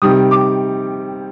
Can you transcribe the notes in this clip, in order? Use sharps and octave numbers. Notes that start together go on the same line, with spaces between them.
C3 D#3 G3 D#6
D6